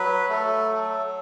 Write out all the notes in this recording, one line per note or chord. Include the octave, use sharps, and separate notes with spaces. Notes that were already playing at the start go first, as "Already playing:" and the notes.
Already playing: F#3 B4
A3 A4
F#3